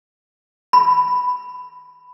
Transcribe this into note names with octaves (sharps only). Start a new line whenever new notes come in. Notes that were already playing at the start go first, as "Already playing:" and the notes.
B5